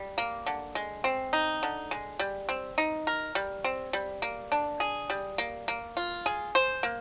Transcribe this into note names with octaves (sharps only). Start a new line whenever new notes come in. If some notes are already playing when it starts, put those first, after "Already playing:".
Already playing: G3
A#3
D3
G#3
C4
D#4
D3
G#3
G3
C4
D#4
A#4
G3
C4
G3
A#3
D4
G#4
G3
A#3
A#3
F4
G#4
C5
A#3